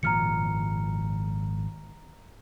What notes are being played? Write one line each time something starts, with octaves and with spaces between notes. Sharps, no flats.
G#1 A#2 F3 A#5 F6 C#7